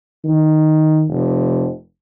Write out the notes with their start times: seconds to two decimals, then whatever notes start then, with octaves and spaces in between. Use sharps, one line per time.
0.24 D#3
1.08 F1